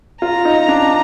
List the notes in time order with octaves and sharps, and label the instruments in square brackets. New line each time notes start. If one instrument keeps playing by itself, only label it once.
[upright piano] F4 [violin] A#5
[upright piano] D#4
D4